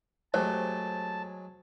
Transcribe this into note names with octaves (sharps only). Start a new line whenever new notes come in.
F#3 G#3 A3 G4 C5 A5